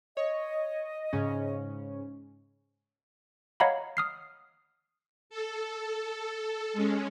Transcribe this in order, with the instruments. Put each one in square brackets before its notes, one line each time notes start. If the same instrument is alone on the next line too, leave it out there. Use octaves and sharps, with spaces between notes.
[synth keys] C#5 [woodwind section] D#5
[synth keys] G#2 C#3 C#4
[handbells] C#5 D#5 F5 F#5 A#5 B5
D#6 F6 C7
[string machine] A4
G#3 C#4